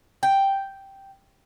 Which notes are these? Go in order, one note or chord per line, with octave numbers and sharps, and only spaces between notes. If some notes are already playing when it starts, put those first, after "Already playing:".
G5